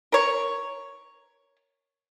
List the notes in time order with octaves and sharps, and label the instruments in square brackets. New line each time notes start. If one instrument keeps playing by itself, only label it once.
[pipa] A#4 C#5